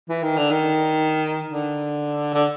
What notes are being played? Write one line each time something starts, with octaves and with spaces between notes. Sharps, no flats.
E3
D#3
D3
D#3
D3
D3